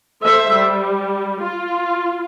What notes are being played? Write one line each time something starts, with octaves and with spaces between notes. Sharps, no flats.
A4 C5 E5
G3
F4